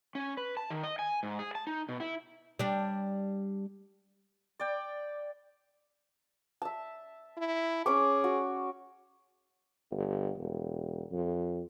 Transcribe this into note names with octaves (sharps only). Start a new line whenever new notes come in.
C#4
B4
A5
D#3
D#5
G#5
G#2
G#4
A5
D#4
B2
E4
G3 D4
D5 G5
E5 A5
E4
C#4 G#4 C#5 D6
F#4
G1
E1
F2